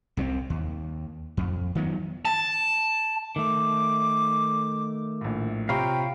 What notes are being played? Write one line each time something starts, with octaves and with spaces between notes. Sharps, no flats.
C2 C3 G3 C4
D#2
F2
D#3 F3 F#3 B3
A5
D#3 A3 D6
A#1 A2
C3 F4 C#5 F5 G5 A#5 B5